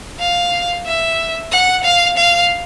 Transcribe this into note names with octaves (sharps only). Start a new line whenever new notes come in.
F5
E5
F#5
F5
F5